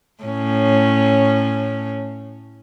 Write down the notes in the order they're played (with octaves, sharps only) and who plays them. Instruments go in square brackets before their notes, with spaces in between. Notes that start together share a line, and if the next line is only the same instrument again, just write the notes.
[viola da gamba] A2 C#4